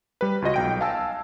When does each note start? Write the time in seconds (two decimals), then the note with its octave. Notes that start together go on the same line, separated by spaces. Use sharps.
0.21 G3 B4
0.42 C#2 F4 F#4 D#5 A#6
0.54 B1 G5 D7
0.81 F5 G#5 A5 E6